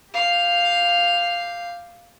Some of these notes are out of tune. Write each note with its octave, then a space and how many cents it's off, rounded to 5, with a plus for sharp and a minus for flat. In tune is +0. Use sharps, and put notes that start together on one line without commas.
G4 +5 F5 +0